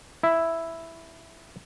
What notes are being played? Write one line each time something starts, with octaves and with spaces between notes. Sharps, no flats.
E4 E5